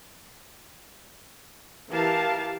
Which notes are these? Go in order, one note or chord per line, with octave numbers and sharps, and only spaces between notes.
E3 G4 A#4 F5 A5